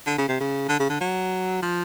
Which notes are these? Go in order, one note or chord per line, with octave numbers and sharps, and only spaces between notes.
D3
C#3
C3
C#3
D3
C#3
D3
F#3
F3